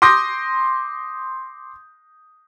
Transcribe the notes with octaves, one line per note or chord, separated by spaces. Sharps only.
C6 D6 D#6 G6 A#6